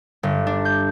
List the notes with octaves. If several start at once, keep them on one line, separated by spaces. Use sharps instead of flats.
G1
D4
G6